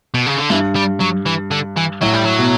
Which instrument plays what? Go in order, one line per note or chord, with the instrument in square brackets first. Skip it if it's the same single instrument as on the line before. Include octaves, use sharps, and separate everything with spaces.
[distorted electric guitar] B2
C#3
D3
[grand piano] G2 [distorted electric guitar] E3
[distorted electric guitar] G3
F#3
E3
D3
E3
[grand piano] A2 [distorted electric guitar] F#3
[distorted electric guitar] G3
F#3
[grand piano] B2